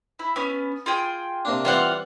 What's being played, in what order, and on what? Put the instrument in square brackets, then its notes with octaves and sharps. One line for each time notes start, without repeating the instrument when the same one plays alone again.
[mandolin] E4
B3 C#4
F4 G#4 G5
[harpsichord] C3 A#3 D4
[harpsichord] E3 G3 C4 [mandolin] F4 F5 F#5